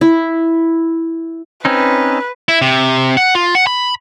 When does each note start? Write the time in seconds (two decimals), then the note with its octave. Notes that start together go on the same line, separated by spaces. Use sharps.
0.01 E4
1.65 C4 C#4 D#4 B4
2.49 E4
2.62 C3
3.17 F#5
3.35 F4
3.55 F#5
3.67 B5